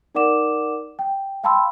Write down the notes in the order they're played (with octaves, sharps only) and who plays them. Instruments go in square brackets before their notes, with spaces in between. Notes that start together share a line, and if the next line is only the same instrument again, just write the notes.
[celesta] D#4 A#4 D5 F#5 D6 E7
G5
F5 G5 A5 B5 C6 E6